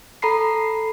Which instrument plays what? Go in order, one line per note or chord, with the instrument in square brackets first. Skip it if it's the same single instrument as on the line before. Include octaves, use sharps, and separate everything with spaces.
[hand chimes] A4 A#5 B5 C7